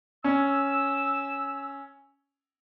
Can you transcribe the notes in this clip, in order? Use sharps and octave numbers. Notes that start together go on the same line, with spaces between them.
C#4 E6